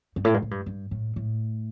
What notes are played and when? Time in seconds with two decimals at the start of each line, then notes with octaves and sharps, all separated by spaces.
0.16 G2
0.25 A2
0.34 G2
0.42 A2
0.51 G2
0.66 G2
0.91 A2
1.16 A2